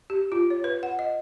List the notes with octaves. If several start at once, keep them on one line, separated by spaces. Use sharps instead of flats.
G4
F4
C#5
B4
F#5
D#5